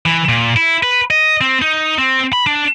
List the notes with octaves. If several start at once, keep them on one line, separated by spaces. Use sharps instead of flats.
E3
A#2
E4
B4
D#5
C4
D#4
C4
B5
D4